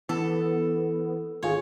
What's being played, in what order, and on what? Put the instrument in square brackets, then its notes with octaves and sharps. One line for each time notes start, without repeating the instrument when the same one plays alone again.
[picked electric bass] E3 [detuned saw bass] B3 [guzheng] A4
[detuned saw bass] G#1 [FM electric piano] D#3 F4 G#4 [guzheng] C#5